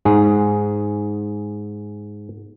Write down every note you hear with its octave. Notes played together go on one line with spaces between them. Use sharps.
G#2 G#4